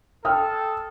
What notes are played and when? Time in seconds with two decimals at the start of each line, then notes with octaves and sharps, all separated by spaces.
0.25 A4 G5 D#6 F6